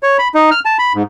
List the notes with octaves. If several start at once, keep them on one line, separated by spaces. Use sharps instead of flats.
C#5
B5
D#4
F6
A5
B5
G#2